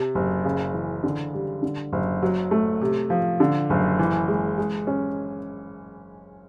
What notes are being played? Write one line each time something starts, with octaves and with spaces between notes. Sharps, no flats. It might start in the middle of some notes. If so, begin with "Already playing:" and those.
Already playing: C3
F#1
C#3
E3
D3
G3
D3
F#1
F#3
A3
C3
F3
D3
F#1
E3
G#3
G#3
C#4